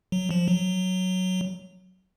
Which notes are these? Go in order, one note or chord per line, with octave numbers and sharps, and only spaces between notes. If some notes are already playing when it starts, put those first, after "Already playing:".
F#3
F3
F#3